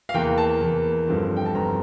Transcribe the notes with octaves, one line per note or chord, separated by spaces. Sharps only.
F5
E2 E3 A#3 G5
A5
E2 E3 A#3
G1 G2 D3 F3 C4
G5
A5
G1 G2 D3 F3 C4 A#5